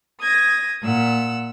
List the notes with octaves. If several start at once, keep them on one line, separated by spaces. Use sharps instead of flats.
D#6 G#6 A#6
A#2 F#5 E6